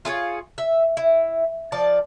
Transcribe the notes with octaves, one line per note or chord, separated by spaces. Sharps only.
F4 G#4 C5 C#5
E5
E4
F3 D5 A5